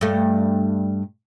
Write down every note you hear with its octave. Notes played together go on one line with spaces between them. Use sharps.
G2 A3